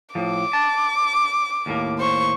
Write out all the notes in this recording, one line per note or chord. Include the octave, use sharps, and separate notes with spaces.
A2 F3 D6
A5
D#2 A2 A#3
C5 C#6